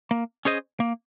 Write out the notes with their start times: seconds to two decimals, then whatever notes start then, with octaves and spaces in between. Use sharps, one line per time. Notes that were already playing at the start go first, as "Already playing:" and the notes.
0.11 A#3
0.45 C#4 G#4 C5 D#5
0.80 A#3